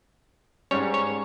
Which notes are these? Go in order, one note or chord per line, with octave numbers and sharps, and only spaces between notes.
G#2 G3 C#4 C#5
C#5